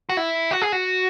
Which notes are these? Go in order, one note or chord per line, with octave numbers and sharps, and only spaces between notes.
F#4
E4
F#4
G#4
F#4